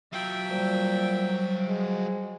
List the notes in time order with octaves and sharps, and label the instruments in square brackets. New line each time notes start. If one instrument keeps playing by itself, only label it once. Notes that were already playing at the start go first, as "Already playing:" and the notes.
[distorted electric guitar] F#3 F4 [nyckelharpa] E5 G5
[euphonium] A#2 [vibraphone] G3 C5
[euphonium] G#3